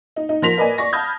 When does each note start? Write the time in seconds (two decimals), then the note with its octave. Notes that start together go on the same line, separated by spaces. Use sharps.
0.16 D#4
0.29 D#4
0.42 F3 A#4 C6 A#6 B6 F7
0.57 A#4 B4 D5 D#5 G#5
0.78 D5 C#6 A#6
0.93 A5 B5 D#6 F6 G6 G#6